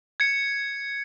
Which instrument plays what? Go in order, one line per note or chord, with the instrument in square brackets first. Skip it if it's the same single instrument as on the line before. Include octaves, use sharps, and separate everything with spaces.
[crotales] G#6 C#7